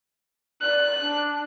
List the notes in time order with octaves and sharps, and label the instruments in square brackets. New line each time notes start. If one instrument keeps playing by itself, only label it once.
[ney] D5 [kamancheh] F#6
[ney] D4